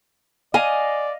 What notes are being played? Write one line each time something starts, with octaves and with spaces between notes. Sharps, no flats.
D5 D#5 F5 G#5